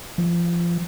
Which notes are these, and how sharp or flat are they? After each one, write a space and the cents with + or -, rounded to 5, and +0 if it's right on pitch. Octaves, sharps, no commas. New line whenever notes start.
F3 -25